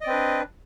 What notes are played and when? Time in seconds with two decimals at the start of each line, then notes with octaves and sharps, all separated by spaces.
0.01 D#5
0.04 D5
0.07 C4
0.10 B4
0.13 D4